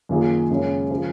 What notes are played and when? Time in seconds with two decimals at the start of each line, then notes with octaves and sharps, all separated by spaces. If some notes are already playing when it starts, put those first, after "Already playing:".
0.09 F#2 D#3 A#3 F4 G#4
0.50 F#2 C#3 G#3 C#4
0.90 C#3 F3